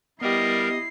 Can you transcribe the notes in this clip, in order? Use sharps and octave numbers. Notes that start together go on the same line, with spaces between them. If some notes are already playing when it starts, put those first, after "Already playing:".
G3 B3 E4 G4 A#4 D#5 C7